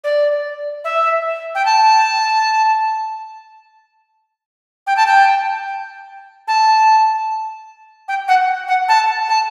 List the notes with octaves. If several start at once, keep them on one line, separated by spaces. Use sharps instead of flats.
D5
E5
G5
A5
G5
A5
G5
A5
G5
F#5
F#5
A5
A5